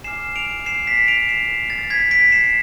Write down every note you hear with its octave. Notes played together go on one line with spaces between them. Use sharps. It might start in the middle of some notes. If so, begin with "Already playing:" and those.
G#5 D6 F6 C7 E7
D7 F7
C7 E7
B6 D7
D7 F7
C7 E7
A6
G#6 B6
B6 D7
C7 E7